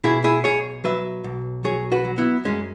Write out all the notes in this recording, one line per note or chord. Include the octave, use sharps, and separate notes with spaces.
B2 E4 G#4
E4 G#4
B1 G#4 C#5
F#3 B4 E5
B1
F#3 G#4 C#5
F#4 B4
F#3
B3 E4
F#2 G#3 C#4